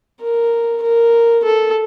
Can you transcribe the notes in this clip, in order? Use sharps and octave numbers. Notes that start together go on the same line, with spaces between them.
A#4
A#4
A4